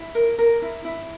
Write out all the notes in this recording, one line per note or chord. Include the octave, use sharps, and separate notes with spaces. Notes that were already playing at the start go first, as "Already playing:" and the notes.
Already playing: E4
A#4
A#4
E4
E4